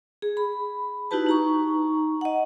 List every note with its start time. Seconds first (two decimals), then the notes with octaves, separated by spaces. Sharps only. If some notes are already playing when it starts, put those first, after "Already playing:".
0.22 G#4
0.37 B5
1.11 D#4 E4 F#4 G4 B4 A5
1.26 D#4 A#5 C#6
2.21 D#5 F#5